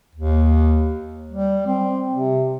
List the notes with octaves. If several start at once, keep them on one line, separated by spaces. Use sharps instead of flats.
D#2
G3
C4
C3